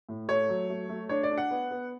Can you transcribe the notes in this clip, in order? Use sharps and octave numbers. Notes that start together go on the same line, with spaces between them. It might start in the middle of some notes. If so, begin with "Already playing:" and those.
A2
A3 C#5
F#3
A3
A3
D4 C#5
D5
D4
F#5
B3
B3